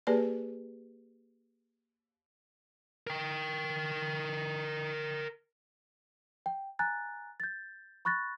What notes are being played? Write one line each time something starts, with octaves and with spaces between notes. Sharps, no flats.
A#3 G4 G#4 B4 D5 A5
A#4 G5
G5
G#5 A#5 F#6 A6
G6 A6
B5 C#6 F#6 A6 A#6